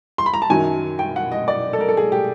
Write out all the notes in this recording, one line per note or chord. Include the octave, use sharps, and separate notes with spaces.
C6
B5
A#5
A5
F#2 D#3 F#3 G#5
G5
F#5
D#5
D5
A4
A#4
A4
G#4
G4